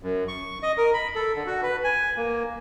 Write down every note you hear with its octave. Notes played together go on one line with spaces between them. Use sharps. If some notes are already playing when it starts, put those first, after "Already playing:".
F#2
C#6
D#5
A#4
B5
A4
D3
F#4
B4
G#5
A#3